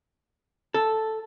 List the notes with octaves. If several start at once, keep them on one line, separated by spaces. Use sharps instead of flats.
A4